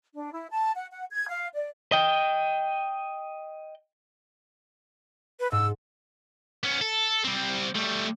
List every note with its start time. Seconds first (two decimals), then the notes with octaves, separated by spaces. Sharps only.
0.14 D4
0.31 E4
0.50 A5
0.75 F#5
0.90 F#5
1.11 G#6
1.28 F5
1.56 D5
1.92 D#5 G5
5.40 B4
5.52 G#2 E6
6.63 B3 C#4
6.81 A4
7.24 G3 C4
7.75 G3 A3